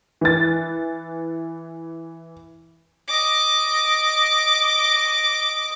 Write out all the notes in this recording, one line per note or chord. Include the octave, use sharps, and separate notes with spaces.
E3 A6
D#5 D6